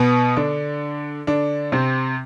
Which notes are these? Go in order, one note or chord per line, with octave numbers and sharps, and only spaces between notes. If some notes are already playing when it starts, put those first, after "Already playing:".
Already playing: B2 B3
D3 D4
D3 D4
C3 C4